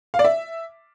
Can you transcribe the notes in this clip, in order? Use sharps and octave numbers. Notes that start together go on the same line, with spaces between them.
F5
D5
E5